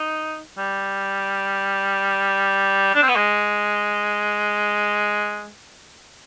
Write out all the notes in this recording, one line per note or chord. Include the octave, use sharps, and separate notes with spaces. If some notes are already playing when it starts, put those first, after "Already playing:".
Already playing: D#4
G3
D4
C4
B3
G#3